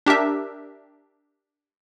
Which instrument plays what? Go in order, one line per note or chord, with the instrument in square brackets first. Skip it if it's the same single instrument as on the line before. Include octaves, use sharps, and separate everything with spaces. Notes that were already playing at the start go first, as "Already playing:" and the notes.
[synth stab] D4 G4 A#4 E5